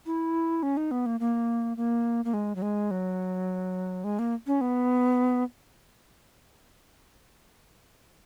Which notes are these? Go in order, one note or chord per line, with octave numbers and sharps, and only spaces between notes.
E4
C#4
D#4
B3
A#3
A#3
A#3
A#3
G#3
F#3
G#3
F#3
G#3
A#3
C#4
B3